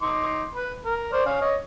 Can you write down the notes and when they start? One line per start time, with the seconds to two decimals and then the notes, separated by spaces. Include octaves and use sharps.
0.02 D#4 C6 D6
0.55 B4 B5
0.86 A#4
1.13 C5 D5
1.26 C#4 F5
1.41 C#5 D#5